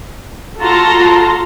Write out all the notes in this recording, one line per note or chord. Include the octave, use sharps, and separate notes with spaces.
F4 F#4 A4 A5 A#5 C6